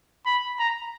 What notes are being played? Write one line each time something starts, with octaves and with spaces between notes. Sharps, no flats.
B5
A#5